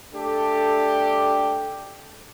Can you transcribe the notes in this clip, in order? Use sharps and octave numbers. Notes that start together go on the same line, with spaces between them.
A3 D4 G4 A4